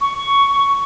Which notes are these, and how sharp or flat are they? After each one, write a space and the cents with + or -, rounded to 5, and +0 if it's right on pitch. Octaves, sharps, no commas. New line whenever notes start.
C#6 +10